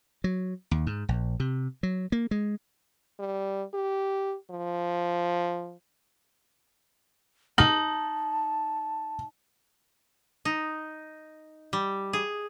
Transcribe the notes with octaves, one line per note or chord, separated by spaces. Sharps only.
F#3
D#2
G#2
A#1
C3
F#3
A#3
G#3
G3
G4
F3
D#4 A5 F#7
D#4
G3
G#4